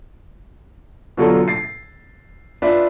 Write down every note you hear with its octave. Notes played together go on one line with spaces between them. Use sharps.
B2 D3 F#3 F4 A4
A6 C7
D4 F4 B4 E5